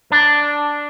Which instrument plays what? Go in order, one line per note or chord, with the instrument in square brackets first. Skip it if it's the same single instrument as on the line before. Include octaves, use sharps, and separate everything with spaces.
[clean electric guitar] D4